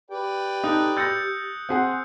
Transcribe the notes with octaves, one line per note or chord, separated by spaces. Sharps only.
G4 B4 D5 G5
D#4 A4 D#6 F#6
E6 G6 A6 A#6 C#7
C4 G#4 F#5